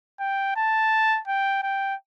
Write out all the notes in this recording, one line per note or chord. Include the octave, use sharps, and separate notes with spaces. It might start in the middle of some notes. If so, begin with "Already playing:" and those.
G5
A5
G5
G5